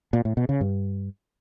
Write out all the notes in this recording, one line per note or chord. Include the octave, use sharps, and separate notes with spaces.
A#2
A2
B2
C#3
G2